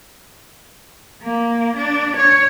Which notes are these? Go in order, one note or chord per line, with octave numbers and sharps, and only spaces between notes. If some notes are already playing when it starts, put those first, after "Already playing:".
A#3
D4
C#5